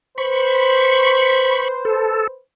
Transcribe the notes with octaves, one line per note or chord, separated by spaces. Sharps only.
B4 C5 B5 C#6
A4